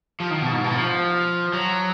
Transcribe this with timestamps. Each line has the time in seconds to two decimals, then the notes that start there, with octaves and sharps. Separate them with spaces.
0.20 F3
0.31 D#3
0.42 B2
0.53 G#2
0.64 B2
0.75 F3
1.53 F#3